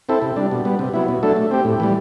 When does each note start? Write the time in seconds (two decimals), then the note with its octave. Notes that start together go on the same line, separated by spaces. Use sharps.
0.09 C4 E4 A4
0.22 C3
0.36 G3 D4
0.51 B2
0.65 G3 B3
0.79 C3
0.94 F#3 B3 E4
1.08 B2
1.23 F#3 A3 D4 A4
1.36 A3
1.51 C4 G4
1.65 A2
1.80 E3 G3